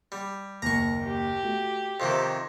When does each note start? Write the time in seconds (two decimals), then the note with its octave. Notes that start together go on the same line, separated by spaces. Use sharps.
0.12 G3
0.62 F#1 D#2 A#5 C#6
1.05 G4
1.43 A3 F#4
2.00 F2 C3 D#3 E5 C6